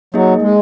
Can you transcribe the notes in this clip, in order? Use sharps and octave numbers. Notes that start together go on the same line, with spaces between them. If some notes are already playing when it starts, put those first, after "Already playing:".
F#3 A#3 D#4 G#4 D#5
G#3